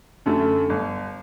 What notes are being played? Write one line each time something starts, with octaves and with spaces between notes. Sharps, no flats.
F#2 D3 A3
G1